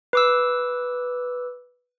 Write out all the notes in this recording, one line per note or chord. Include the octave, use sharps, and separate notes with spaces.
B4 D6 E6